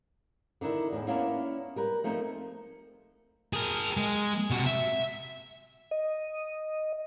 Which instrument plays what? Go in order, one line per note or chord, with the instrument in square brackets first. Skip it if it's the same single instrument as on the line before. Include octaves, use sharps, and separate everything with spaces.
[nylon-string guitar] D3 D#3 D4 E4
E2 A2
A#3 B3 C#4 D4 E4 F4
G3 A#4 B4
F3 A3 A#3 C4 D#4
[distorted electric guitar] G#4 A#4
G#3
C3 F#4
E5
[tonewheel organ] D#5